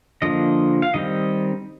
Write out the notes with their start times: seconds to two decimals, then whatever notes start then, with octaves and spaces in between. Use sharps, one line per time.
0.22 D3 F3 A#3 D#5
0.82 F5
0.94 D#3 G3 C4 D#5